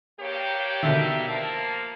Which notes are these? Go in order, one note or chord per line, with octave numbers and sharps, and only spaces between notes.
G2 A#3 G4 C#5
B2 D3 D#3 E5
F3 A#3 A5